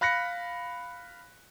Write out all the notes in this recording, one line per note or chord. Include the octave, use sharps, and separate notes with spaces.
F5 B5 F#6 A#6 B6 C#7